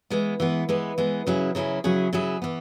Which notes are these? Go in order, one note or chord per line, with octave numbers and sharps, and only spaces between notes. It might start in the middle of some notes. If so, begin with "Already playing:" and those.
E3 G#3 B3
E3 G#3 B3
E3 G#3 B3
E3 G#3 B3
C#3 F#3 C#4 E4 G#4
C#3 F#3 C#4 E4 G#4
C#3 F#3 C#4 E4 G#4
C#3 F#3 C#4 E4 G#4
E3 B3